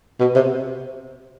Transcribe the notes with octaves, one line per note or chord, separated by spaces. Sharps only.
B2
C3